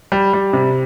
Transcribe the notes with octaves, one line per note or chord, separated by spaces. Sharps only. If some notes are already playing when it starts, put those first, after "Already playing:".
G3
G3
C3